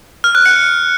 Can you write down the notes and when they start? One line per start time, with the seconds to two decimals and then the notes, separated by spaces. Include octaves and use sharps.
0.24 F6
0.35 F#6
0.46 C#7